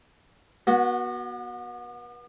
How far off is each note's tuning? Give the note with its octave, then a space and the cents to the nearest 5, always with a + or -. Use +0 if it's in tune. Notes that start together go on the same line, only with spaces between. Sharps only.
B3 -35 F#4 +0